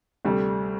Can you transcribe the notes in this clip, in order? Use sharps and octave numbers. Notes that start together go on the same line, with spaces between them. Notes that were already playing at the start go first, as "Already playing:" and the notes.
D2 C3 G3 A3